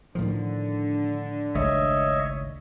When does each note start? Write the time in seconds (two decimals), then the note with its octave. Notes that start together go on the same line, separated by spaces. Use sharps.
0.15 A2 D3 D#3 F3
1.55 G#1 C#2 A3 C#5 D#5 E5